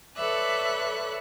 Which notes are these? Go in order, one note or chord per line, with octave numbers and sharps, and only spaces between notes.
A4 B4 C#5 D5 E5 F#6